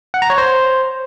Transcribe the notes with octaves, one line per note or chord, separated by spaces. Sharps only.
F#5
A#5
C#5
C5